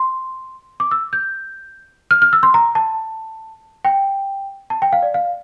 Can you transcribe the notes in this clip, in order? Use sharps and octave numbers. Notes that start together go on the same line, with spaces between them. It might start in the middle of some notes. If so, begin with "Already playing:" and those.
Already playing: C6
D6
E6
G6
F6
F6
E6
C6
A#5
A5
G5
A5
G5
F5
D5
F5